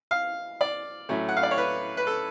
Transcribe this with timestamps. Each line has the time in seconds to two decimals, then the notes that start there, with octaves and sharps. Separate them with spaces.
0.11 F5
0.61 D5
1.09 A2 F#3 A3 C#4
1.29 F#5
1.37 F5
1.43 D5
1.51 C#5
1.58 B4
1.97 B4
2.07 A4